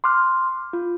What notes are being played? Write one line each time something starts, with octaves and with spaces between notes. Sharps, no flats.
C6 D6 F6 F#6
F4